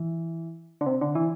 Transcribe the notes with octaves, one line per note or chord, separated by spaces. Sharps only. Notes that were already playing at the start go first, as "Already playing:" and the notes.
Already playing: E3
D3
C3
D3
E3